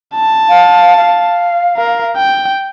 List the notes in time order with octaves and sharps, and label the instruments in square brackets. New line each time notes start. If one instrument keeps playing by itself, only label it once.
[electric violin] A5
[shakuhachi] F5
F5
[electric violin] A#4
G5